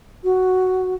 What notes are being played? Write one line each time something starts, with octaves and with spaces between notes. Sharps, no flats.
F#4